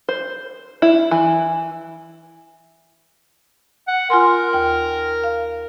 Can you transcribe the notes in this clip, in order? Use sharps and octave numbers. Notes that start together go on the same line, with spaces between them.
C5
E4
E3
F#5
F4 A#4 G#5 C6
D#2 G5
F5